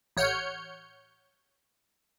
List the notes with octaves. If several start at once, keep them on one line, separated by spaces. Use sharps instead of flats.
A1 C#5 F#5 F6 G6 C#7